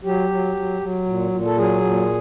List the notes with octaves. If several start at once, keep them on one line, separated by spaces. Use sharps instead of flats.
F#3 G4
F#3
F#3
F#3
A#2
A#2
A4
F#3 G#4
A#2